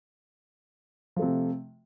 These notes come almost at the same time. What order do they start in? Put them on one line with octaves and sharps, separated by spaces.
F3 A3 C3